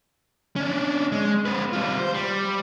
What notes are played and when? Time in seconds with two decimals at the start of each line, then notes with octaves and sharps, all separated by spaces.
0.56 C#4 D4
1.12 G#3
1.46 C4 B4
1.73 G3 F4
1.99 C5
2.14 G3